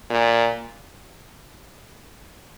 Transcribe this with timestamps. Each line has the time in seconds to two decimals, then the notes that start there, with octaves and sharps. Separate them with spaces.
0.11 A#2